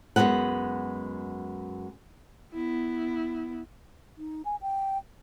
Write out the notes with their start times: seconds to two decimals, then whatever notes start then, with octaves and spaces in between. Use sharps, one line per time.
0.16 F#2 F#3 G#3 B3 F#5
2.55 B3 E4
4.18 D#4
4.45 G#5
4.62 G5